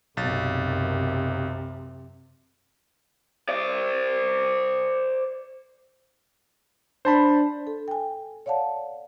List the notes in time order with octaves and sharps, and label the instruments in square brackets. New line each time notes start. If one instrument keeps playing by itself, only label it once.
[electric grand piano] B1 A6 [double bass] F#2 C3
[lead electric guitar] C5 D5
[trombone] D4 [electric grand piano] C5 A5 B5
[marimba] A4
G5 G#5
C#5 D5 F5 F#5 A5